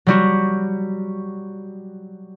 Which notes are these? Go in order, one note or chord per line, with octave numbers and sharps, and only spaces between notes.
F#3 G3 F#4